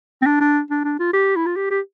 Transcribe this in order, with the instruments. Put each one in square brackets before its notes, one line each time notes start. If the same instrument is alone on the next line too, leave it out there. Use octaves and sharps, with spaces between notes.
[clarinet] C4
D4
D4
D4
D4
F4
G4
E4
F4
G4
G4